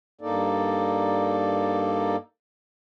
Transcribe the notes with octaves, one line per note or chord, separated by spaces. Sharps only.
G2 A#3 D#4 A4 D5